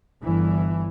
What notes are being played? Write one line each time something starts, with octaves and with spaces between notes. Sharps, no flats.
G1 E3